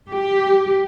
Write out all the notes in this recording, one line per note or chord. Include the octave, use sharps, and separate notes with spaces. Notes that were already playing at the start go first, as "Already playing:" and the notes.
G4